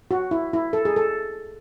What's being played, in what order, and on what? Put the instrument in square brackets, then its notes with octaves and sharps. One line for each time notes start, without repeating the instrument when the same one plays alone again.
[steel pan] F#4
E4
E4
A4
G#4
A4